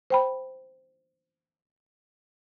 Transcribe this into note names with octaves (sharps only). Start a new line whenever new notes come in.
C5 G5 B5